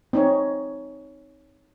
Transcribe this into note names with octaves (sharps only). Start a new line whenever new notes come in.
C4 D#4 C#5